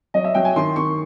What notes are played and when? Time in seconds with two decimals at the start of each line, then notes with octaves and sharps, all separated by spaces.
0.14 F#3 D#5
0.24 E5
0.34 F#3 G5
0.45 G#5
0.56 D#3 C6
0.76 D#3 C#6